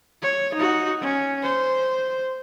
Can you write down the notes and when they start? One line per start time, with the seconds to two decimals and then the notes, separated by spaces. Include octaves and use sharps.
0.22 C#5
0.55 D#4 F#4
1.01 C#4
1.42 C5